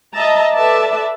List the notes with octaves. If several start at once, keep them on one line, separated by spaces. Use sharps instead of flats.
D#5 E5 A5 A#5
A4 B4 D5 E5 A5